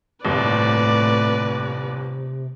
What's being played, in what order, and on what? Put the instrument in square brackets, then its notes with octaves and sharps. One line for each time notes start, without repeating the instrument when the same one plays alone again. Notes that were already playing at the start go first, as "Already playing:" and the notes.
[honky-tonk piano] G1 D#2 [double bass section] A2 [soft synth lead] C3 [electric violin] B4 D5